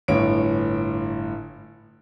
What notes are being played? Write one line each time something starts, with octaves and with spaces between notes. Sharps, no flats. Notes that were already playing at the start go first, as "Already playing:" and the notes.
G1 A2 C#5 D7